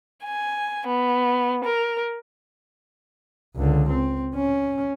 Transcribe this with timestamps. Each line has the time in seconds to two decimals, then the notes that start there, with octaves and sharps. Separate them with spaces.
0.24 G#5
0.87 B3
1.64 A#4
3.56 C#2 D3
3.89 C4
4.35 C#4